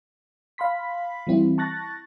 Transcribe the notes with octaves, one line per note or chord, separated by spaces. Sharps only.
F5 B5 C6 B6
E3 G3 C4 E4
A5 C#6 F#6 A6 A#6